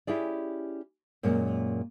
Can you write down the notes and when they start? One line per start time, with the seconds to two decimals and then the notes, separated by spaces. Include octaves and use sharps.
0.07 C#4 E4 G4 G#4 D5
1.23 F#2 A#2 G#3 A#3 C#4